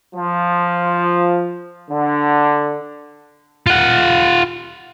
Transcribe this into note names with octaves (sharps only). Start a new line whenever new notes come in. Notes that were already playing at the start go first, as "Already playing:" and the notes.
F3
D3
F4 F#5